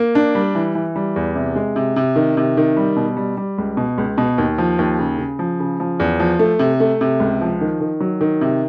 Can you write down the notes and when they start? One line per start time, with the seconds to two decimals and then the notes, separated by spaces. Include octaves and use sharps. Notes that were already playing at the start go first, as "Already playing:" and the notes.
Already playing: A#3
0.15 D4
0.35 G3
0.55 E3
0.75 E3
0.96 G3
1.16 E2
1.36 C3
1.56 G#3
1.76 C3
1.96 C3
2.16 D#3
2.37 C3
2.57 D#3
2.77 G3
2.96 B2
3.17 G3
3.37 G3
3.58 C#2
3.77 B2
3.98 C#2
4.18 B2
4.38 D#2
4.58 F3
4.79 D#2
4.99 C#3
5.19 C#3
5.39 F3
5.60 C#3
5.80 F3
6.00 E2
6.20 F3
6.39 A3
6.59 C3
6.80 A3
7.01 C3
7.20 C#2
7.41 F3
7.61 D#3
7.80 D#3
8.00 F#3
8.21 D#3
8.41 C3